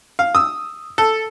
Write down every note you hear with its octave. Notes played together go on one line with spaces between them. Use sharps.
F5
D#6 E6
A4